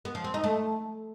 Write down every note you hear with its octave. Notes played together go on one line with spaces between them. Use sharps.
B3
F3
C4
D#4
A3